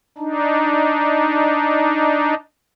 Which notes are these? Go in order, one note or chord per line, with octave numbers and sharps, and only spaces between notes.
D4 D#4